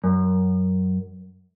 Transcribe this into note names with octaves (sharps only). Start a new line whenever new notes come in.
F#2